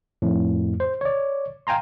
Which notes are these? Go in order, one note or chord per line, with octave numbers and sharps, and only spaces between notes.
F2 A2
C5
C#5 D5
F5 G5 G#5 A#5 C6